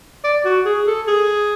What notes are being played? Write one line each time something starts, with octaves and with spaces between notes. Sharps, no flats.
D5
F#4
G#4
A4
G#4